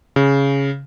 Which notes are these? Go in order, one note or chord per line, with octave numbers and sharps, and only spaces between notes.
C#3